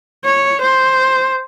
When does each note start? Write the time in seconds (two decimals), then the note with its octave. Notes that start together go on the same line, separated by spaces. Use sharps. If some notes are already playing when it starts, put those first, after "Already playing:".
0.24 C#5
0.61 C5